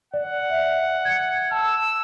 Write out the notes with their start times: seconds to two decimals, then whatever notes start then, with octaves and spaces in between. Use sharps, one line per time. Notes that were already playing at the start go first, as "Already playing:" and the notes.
0.14 D5 F#5
0.50 E5
1.05 G#6 C#7
1.51 A5 E6